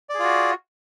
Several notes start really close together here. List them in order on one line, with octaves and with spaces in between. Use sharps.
D5 G#4 F4 F#4